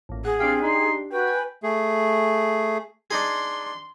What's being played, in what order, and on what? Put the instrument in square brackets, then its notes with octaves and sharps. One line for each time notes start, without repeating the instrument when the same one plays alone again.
[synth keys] A1 A#2
[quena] G#4 [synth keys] F#5
[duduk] C4 [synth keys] D4 G4 [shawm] F5
[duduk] D#4 [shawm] C6
[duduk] F#4 [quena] B4 [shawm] G5
[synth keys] G#5
[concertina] A3 G#4
[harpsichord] D4 D#4 G#4 [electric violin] C6